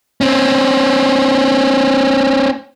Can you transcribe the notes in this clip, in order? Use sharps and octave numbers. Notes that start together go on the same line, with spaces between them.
C4 C#4